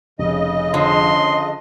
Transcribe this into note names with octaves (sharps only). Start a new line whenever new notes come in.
F1 C#3 D#5
D3 F3 C6